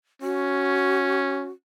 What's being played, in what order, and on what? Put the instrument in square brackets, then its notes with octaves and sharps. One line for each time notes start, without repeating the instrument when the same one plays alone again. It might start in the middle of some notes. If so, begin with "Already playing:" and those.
[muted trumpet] C#4 [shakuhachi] F#4